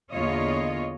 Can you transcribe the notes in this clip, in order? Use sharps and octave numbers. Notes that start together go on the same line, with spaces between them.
E2 D3 A#3 F4 C#5 D#5